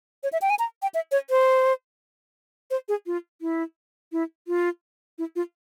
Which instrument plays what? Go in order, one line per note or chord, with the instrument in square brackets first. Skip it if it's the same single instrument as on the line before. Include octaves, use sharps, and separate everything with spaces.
[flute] C#5
E5
G5
G#5
A#5
G5
E5
C#5
C5
C5
G#4
F4
E4
E4
F4
E4
F4